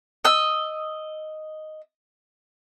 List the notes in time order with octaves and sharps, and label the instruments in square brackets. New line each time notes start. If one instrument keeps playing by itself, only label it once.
[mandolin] D#5 E6